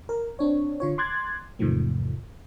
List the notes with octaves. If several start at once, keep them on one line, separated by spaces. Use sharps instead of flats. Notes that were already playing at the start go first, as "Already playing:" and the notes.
A#4
C4 D4 C#5
D3 F4 C#5
C6 D6 F#6 G#6 A6
E2 G#2 C3 D#3 F3 A3